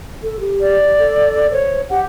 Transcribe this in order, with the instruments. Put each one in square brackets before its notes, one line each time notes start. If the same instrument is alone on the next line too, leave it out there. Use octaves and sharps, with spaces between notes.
[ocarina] A4
G4
[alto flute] D5
[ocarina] A4
[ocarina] C5 [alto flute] C#5
[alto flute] G4 [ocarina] F#5